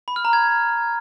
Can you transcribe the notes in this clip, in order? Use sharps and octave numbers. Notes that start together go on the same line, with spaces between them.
B5
F6
A#5
G#6